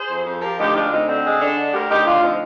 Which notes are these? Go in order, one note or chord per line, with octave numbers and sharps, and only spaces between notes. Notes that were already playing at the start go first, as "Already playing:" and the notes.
Already playing: G#4 C5
F2
F2
F3 G4 A#4
D2 D#4 G4
G#3 D4 F4
D2 C4 D#4
D3 C4
G#3
D3 D4
D3
D2 G4 A#4
D2 D#4 G4
D2 D4 F4
F3 C4 D#4